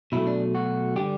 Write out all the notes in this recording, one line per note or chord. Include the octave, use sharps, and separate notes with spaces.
B2 F#3 A3 E4
D4
F#4
D3 G3 D4 G4